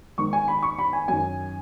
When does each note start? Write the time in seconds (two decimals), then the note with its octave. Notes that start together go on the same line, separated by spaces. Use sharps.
0.18 G#2 D#3 C#6
0.33 G#5
0.48 B5
0.63 C#6
0.79 B5
0.93 G#5
1.08 F#2 D#3 G#5